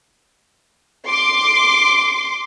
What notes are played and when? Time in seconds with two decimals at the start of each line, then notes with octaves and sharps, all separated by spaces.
1.08 C6 D6